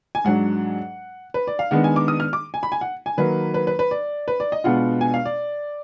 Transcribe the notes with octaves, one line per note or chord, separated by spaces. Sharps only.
G#5
G#2 F#3 D4 F#5
B4
D5
F5
D#3 G#3 B3 D4 F#5
G#5
D6
D#6
F6
D6
G#5
B5
G#5
F#5
G#5
D#3 F#3 A#3 B4
B4
B4
B4
D5
B4
D5
D#5
B2 G#3 B3 D4 F4 F#5
G#5
F5
D5